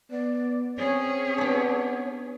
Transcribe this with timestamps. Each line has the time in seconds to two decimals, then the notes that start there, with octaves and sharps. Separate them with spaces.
0.11 B3 D5
0.78 C4 C#4 G#4 C#5
1.38 B3 D4